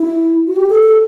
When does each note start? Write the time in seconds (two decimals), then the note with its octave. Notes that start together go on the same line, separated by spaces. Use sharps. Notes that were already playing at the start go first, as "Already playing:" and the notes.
Already playing: E4
0.47 F#4
0.56 G4
0.69 A4
0.83 A4